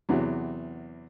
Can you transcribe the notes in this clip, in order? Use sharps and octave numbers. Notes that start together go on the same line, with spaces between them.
E2 C3 E3 F#3